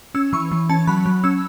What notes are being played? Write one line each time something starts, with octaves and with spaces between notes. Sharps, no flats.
C#4 E6
E3 C#6
E3
C#4 A5
F#3 B5
F#3
C#4 E6